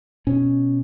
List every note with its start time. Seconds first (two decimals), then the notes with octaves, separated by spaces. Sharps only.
0.27 B2 C#4